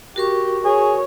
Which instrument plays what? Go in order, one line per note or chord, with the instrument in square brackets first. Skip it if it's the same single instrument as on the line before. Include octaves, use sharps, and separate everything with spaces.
[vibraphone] F#4 A#4 C#6 [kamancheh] G4
[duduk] G#4 [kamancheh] C#5